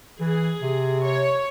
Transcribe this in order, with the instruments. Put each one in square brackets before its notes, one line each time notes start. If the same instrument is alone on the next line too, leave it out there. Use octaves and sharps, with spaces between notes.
[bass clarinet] E3 [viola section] G#4
[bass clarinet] C3
[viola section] C#5